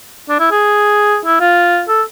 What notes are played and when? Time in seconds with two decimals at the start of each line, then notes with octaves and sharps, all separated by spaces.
0.29 D4
0.39 E4
0.51 G#4
1.25 E4
1.40 F4
1.88 A4